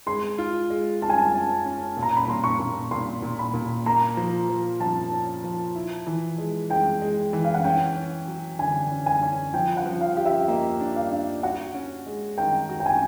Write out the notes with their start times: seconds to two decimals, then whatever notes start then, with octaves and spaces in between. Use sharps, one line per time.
0.07 G#3 C6
0.38 F4
0.70 G#3
1.01 F4 A5
1.09 G#5
1.18 A5
1.33 C#4
1.65 C#4
1.97 A#2
2.03 A#5
2.17 B5
2.28 A#2 C6
2.44 C#6
2.59 A#2
2.91 A#2 C6
3.22 A#2
3.39 B5
3.54 A#2
3.86 A#3 A#5
4.17 F3
4.49 F3
4.80 F3 A5
5.11 C#4
5.44 F3
5.75 E4
6.07 E3
6.38 G#3
6.70 G#3 G5
7.02 G#3
7.33 E3
7.45 F5
7.54 F#5
7.64 C#4 G5
7.96 C#4
8.28 F#3
8.59 D3 G#5
8.91 C#4
9.06 G#5
9.22 C#4
9.54 F3 G5
9.77 F#5
9.86 F3
10.01 F5
10.17 G4
10.25 E5
10.48 A#3 D#5
10.81 D4
10.96 F5
11.11 D4
11.43 F#4 F#5
11.74 C#4
12.06 G#3
12.38 D#3 G5
12.69 F#4
12.80 G5
12.86 G#5